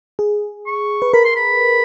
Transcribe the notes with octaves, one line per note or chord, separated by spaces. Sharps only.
G#4
C#6
B4
A#4 B5
C6
B5